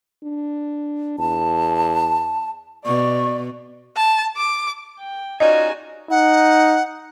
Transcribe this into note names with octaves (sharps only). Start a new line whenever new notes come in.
D4
E2 A5
B2 D5 C#6
A5
D6
G5
C#4 D#4 F4 F#4 D5 D#5 G#5
D#4 F#5